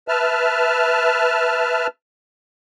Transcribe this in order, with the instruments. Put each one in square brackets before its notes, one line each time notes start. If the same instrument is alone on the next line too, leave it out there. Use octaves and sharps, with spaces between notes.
[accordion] B4 E5 A5 F6